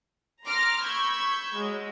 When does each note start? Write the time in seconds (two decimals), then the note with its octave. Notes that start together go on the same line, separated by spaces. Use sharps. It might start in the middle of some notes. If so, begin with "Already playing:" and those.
0.46 A#5 C6 D6 F6 A#6
0.83 B5 C#6 E6 G6 G#6
1.55 F#3 G#3